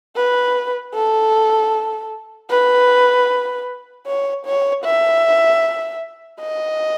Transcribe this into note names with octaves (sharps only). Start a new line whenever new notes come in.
B4
A4
B4
C#5
C#5
E5
D#5